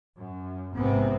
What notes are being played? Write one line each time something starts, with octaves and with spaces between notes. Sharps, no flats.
F#2
A#1 G#2 C3 B3 C4